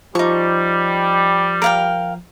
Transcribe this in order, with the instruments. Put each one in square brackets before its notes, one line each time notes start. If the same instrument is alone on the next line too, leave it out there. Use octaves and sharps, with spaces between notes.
[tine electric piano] F3 [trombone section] G3 [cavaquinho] D#4 C#6
[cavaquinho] A#4 F5 G5